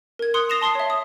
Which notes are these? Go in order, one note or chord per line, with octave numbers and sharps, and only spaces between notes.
A#4 G#6
C6 D#6 F#6 C#7
D#6 A6 A#6 C7 E7 F7
A5 C6 D#6 C7
C#5 E5
D#6